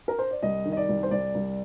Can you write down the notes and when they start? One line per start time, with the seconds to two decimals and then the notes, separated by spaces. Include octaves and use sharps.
0.08 A#4
0.19 C5
0.31 D5
0.43 C2 D#5
0.65 D#3
0.72 D#5
0.77 D5
0.89 C2
1.03 C5
1.11 C2 D5
1.35 C2